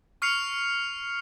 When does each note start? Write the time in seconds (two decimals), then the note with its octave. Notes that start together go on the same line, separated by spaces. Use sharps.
0.22 C#6 F6 C7 C#7 F7